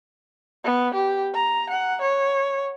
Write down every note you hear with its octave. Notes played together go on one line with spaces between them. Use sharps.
B3
G4
A#5
F#5
C#5